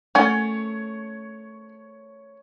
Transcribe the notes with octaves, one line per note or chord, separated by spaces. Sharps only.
A3 C#4 C#5 F#5 G#5